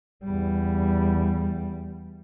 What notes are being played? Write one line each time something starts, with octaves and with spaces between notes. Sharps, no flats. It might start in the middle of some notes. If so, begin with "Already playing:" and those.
E2 G3